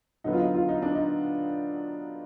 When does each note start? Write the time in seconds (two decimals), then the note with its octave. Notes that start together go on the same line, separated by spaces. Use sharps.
0.24 D3 F#3 B3 D#4
0.33 F4
0.40 D#4
0.55 F4
0.69 D#4
0.82 D4
0.95 D#4